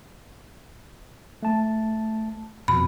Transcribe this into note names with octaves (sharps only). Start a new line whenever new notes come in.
A3 A5
F2 B2 B5